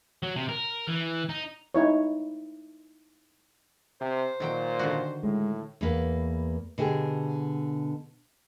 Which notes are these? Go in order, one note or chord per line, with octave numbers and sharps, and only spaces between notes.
F#3
C3
A#4
E3
D#4
D#4 E4 C#5
C3 C5
A#2 D#3 F#3 G5
D3 D#3 F#4
A2 G#3
E2 A#3 B4
B2 D3 G4 G#4